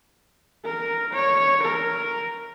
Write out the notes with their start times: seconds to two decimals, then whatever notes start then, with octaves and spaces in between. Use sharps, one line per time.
0.64 A#4
1.13 C#5
1.62 A#4